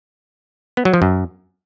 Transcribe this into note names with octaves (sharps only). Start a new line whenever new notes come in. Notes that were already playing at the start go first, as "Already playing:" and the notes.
B3
F#3
F3
F#2